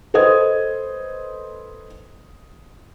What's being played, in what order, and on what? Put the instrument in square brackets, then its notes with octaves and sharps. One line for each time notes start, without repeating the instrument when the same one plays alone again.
[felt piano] A4 B4 C5 D#5 D#6 G#6